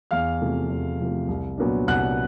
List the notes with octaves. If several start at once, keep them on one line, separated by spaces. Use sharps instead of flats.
E2 F5 F6
C3 F3 A3
E2
C3 F3 A3
C2
A#2 F#3 B3 D4
C2 F#5 F#6